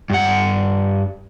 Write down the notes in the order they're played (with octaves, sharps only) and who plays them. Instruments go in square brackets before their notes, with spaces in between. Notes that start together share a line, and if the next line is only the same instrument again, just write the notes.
[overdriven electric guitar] G2 F#5